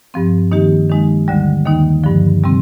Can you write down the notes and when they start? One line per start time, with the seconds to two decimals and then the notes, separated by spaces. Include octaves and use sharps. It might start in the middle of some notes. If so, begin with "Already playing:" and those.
0.14 G2 F3 C4
0.52 D#3 A#3 D#4 G4
0.90 D#3 G#3 D#4
1.28 D2 D3 G3
1.66 D#2 D#3 A#3 D#4
2.04 G2 D3 F3
2.43 C3 G3 C4